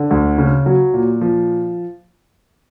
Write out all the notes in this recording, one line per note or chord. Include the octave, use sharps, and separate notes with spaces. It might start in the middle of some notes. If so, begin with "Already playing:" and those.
Already playing: D3
D2
C#3
F#3
A#2
F3